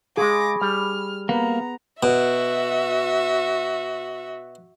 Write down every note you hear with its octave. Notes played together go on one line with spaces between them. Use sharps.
G#3 G#4 F5 B5 C#6 D6 A#6
G3 F6
A#3 B3 A#5
B2 F#4 E5